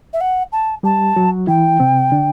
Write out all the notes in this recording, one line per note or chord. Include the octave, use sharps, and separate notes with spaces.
E5
F#5
A5
G3 G4 A5
F#3 F#4
E3 E4 G5
C3 C4
D3 D4